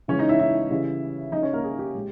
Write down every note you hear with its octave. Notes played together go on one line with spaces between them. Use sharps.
C#3 E3 G#3 C#4 C#5
D#4 D#5
E4 E5
E4 E5
C#3 E3 G3
C#3 G3 D#4 D#5
C#4 C#5
A#3 A#4
G#4
G4
A#2 G#3